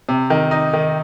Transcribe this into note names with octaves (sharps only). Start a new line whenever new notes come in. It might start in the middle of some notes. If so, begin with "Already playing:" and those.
C3
D#3
D#4
D#3